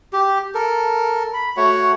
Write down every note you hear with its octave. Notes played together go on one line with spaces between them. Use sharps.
G4
A4 A#4
B5
A3 F#4 C#5 F#5